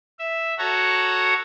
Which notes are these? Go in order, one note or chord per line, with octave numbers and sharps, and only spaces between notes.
E5
F#4 A4 C#5 F#5 A#5